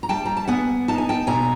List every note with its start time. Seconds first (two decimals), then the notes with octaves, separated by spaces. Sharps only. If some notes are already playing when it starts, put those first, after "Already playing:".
0.03 A#5
0.09 G3 G5 A5
0.25 A#5
0.37 A5
0.48 B3 F#5 G#5
0.88 D#4 A5
0.98 G#5
1.09 G5 A5
1.27 B2 G#5 A#5